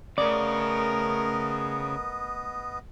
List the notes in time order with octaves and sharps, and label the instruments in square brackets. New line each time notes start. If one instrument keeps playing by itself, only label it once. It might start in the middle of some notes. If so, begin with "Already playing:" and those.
[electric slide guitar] C#3 [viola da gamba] A3 A#4 [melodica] B3 D#5 [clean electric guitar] D5